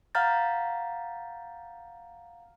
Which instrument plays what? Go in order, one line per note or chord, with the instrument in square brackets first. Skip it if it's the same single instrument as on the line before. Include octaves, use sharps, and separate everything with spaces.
[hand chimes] F5 F#5 A#5 F6 G6 A6